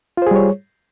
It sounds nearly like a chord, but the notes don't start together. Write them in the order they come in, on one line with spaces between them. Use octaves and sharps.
F4 C5 G#4 G3 C#5